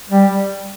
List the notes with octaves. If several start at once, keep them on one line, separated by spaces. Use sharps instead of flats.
G3